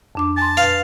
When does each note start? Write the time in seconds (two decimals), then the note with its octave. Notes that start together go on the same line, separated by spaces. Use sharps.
0.15 F2 D4 D6
0.37 G#5 A5 C6
0.57 B4 F5